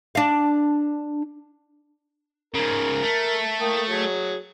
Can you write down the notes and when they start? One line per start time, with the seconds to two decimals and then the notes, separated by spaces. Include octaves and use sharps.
0.15 D4 F5
2.54 G#2 C#3 A#4
3.03 A3
3.61 A#3 G5 D#6
3.89 F#3 G#4